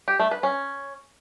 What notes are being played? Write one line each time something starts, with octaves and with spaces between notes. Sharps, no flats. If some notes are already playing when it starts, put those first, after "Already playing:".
G4
A3
B4
C#4